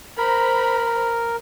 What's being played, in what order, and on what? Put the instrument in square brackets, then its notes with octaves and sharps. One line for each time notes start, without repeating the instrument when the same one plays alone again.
[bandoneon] A#4 [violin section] C5 A#5 B5